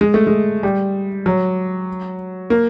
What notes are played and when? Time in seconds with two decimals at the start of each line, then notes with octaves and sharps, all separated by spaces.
0.01 G#3
0.14 A3
0.27 G#3
0.63 G3
1.26 F#3
2.50 A#3